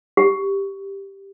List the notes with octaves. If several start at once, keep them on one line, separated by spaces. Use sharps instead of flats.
G4